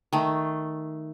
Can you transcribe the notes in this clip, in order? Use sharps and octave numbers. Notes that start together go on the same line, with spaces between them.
D#3 A3